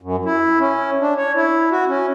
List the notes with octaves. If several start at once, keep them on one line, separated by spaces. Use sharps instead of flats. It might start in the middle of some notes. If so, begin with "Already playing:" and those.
F#2
E4
C#4
D4
C#5
E4
F#4
C#4